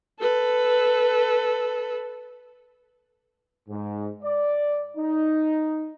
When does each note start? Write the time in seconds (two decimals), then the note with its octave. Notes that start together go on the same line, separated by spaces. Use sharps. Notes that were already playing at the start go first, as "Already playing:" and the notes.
0.19 A4 B4
3.69 G#2
4.23 D5
4.98 D#4